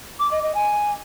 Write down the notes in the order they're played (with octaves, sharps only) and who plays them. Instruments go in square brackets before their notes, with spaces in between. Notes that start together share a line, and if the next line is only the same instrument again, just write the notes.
[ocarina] D6
D#5
D#5
G#5